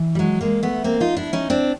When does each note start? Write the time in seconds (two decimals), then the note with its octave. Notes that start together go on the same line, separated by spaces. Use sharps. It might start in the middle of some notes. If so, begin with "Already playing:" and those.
Already playing: E3
0.15 G3
0.19 F#3 G#3
0.41 G#3 A#3
0.63 A3 B3
0.84 A#3 C4
1.00 D#4 F4
1.17 D4 E4
1.33 C#4 D#4
1.50 C4 D4